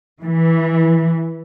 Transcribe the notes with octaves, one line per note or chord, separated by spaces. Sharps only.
E3